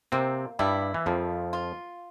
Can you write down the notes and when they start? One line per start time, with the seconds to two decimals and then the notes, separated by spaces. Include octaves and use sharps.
0.12 C3 A#3 C4
0.59 G2 G3 E4
0.94 E3
1.06 F2 F3 A#3
1.53 F4